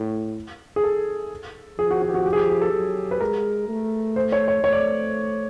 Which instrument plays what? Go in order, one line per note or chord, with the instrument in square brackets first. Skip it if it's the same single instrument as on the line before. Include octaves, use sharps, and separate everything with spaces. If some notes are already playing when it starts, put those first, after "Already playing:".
Already playing: [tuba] A2
[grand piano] G#4
A4
[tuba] F3 [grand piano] G#4
[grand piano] F#4
F#4
G4
F#4
G4
G#4
G4
G#4
A4
[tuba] F#3
[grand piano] B4
[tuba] G#3 [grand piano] A#4
[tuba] A3
[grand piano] C5
C#5
C#5
[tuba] A3 [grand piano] C#5
[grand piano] D5